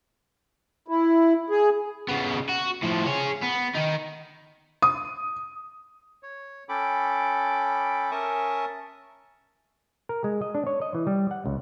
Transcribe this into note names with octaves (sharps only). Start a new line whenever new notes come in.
E4
G#4
C#3 B3
F#4
A2 F3
G#4 C#5
B3
D#3 D#4
D#6
C#5
C#4 A4 G5 B5 D6
C#4 A#4 E5 A5 C#6 D#6
A#4
G#3
D#5
D4
C#5
D#5
E3
G3
F#5
C#2